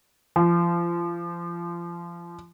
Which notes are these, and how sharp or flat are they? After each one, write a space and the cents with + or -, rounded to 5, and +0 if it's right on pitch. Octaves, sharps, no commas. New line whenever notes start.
F3 -30